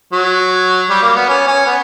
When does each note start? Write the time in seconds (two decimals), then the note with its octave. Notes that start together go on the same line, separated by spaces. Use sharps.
0.13 F#3
0.90 G3
1.02 A#3
1.16 B3
1.29 C#4
1.48 C#4
1.66 B3